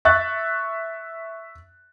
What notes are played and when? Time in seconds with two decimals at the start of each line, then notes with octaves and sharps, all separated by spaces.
0.05 E5 C#6 F#6 A6